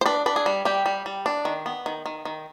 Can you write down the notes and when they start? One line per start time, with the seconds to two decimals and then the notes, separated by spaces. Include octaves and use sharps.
0.01 C5
0.06 D4 B4
0.26 D4 B4
0.36 G#4
0.46 G3
0.65 G3 G4
0.86 G3
1.06 G3
1.26 D4
1.45 D#3
1.66 B3
1.86 D#3
2.06 D#3
2.25 D#3